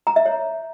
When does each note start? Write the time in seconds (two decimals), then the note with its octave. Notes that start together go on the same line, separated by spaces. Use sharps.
0.07 A#5
0.16 E5
0.26 C#5